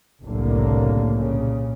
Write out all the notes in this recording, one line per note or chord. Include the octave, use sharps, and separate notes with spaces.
F#1 C2 A2 D3 A#3
A#2 C#3